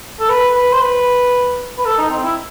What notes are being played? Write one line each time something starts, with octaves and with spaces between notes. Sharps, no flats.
A4
B4
B4
C5
B4
B4
A4
D#4
C4
E4